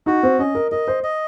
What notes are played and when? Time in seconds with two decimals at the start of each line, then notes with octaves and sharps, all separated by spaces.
0.06 D#4 F#4
0.23 C4
0.39 C#4 D#5
0.55 A#4
0.72 A#4 D#5
0.88 C5
1.03 D#5